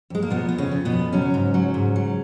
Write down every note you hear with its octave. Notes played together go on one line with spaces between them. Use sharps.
F2 G#3
A#3
B2 F3 B3
F2 B3
C#3 C#4
F3
B2 B3
F2
C#3 F#3 C#4
G#2
F#3
G#2
F#3